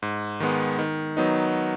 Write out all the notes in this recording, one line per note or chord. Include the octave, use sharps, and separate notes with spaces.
G#2
D#3 G#3 B3
D#3
F#3 B3 D#4